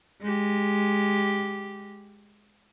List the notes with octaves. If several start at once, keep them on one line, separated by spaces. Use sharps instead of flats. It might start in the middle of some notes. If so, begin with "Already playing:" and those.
G#3 G4